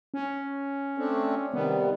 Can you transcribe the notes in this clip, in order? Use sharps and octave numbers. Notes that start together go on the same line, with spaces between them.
C#4
A3 C4 D4
C3 D#3 G3 B3